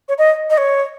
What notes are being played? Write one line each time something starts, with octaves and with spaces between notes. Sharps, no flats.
C#5
D#5
D#5
C#5